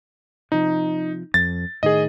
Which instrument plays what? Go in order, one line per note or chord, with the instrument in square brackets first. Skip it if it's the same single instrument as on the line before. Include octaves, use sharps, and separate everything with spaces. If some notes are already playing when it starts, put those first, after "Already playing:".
[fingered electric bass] C3 F3 [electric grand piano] D#4
[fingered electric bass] F2 [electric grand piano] A6
[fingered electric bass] A2 D#3 [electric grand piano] G#4 D#5